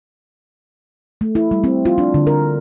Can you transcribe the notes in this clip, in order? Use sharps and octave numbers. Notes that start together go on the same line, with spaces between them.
A3
E4
G3
C4
F4
D4
D3
A#4